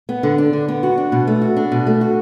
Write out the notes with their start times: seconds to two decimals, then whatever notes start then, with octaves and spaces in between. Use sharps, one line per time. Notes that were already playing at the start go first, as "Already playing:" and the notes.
0.09 B3
0.23 D3
0.38 D4
0.53 D3
0.68 B3
0.83 F#4
0.98 D4
1.12 B2
1.27 A3
1.42 F#4
1.57 D4
1.72 B2
1.87 A3
2.01 F#4